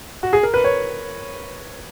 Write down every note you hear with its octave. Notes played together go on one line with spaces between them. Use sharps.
F#4
G#4
A#4
B4
C#5